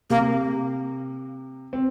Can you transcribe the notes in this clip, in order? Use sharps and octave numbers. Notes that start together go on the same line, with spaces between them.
C3 A#3
C4